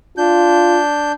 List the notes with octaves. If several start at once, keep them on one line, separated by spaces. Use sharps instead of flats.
D4 F4 G6